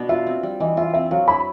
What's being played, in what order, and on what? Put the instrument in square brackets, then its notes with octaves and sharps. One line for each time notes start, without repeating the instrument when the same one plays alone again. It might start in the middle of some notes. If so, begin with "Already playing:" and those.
Already playing: [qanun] B2 B3 D4
[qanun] F4 [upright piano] E5
[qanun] C4
G3
[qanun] E3 [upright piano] D#5
[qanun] F4 [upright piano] E5
[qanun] C4 [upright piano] E5
[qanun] F#3 [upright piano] F5
[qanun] E4 [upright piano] B5